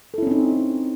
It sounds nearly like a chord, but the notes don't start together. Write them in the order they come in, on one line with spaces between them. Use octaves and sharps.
A4 E4 C#4 C4 D#4